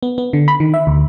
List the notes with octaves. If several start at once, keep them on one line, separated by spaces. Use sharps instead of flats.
B3
B3
D3
B5
D#3
E5
D2